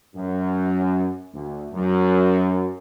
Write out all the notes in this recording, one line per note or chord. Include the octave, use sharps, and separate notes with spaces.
F#2
D2
F#2